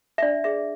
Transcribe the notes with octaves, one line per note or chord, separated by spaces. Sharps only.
E5
D4 D5
G#4 E5